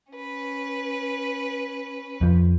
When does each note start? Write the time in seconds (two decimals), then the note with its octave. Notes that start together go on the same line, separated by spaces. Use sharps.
0.12 C#4 B4
2.21 F2 F3